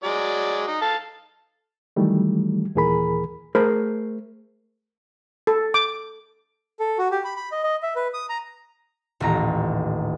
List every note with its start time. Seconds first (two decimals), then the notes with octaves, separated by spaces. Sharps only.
0.04 F#3 G#3 D5
0.67 D#4
0.82 A4 F5 A5
1.96 D#3 E3 F#3 G3 A3
2.75 D#2 A#2 E3 G#4 A#4 B5
3.55 A3 G#4 A#4 C5 B5
5.47 A4
5.74 D6
6.80 A4
6.98 F#4
7.11 G4
7.24 B5
7.36 B5
7.52 D#5
7.63 D#5
7.83 E5
7.96 B4
8.14 D#6
8.29 A#5
9.20 D#1 A1 A#5